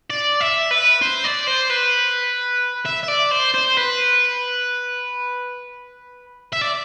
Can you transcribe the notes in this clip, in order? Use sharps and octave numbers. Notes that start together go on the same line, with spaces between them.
D5
E5
B4
C5
D5
C5
B4
E5
E5
D5
C5
C5
B4
E5
D5